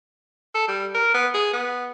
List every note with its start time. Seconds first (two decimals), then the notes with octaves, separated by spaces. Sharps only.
0.55 A4
0.68 G3
0.94 A#4
1.14 B3
1.34 G#4
1.53 B3